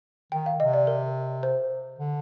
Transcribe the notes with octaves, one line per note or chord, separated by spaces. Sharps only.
D#3 G5
F5
C3 D#5
D5
A#4
C5
D3